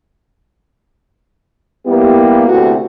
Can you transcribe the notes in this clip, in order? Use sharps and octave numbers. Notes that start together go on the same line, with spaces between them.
G3 A#3 B3 E4 G4
D2 C3 A3 B3 E4 F#4